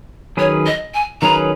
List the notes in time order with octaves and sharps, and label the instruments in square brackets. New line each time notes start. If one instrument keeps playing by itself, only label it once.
[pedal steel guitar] D#3 F#3 C#4 G#4 B4 [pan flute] C#5
[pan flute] D#5
G#5
[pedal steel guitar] D#3 F#3 C#4 G#4 B4 [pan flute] A#5